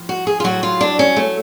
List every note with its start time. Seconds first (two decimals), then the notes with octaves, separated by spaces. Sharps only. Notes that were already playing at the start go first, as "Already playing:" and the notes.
Already playing: A2 F3
0.09 F#4
0.27 G#4
0.40 F4
0.44 A2 F#3 F#4
0.63 F4
0.81 D4
0.99 C#4
1.16 A3